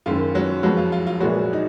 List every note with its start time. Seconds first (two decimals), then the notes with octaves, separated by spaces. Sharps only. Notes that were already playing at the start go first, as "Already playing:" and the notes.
0.06 F#1 F#2 D#3 F4
0.35 F#3 F#4
0.63 F2 F3 F#3 G#3 B3 F#4
0.77 F4
0.92 F4
1.07 F4
1.20 A#1 A#2 F#3 G#3 B3 F#4
1.53 D#4